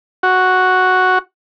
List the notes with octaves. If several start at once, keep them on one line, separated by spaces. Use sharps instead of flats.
F#4